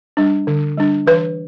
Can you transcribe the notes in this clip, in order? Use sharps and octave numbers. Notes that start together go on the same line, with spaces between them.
G3 D4
D3
G3 D4
E3 B4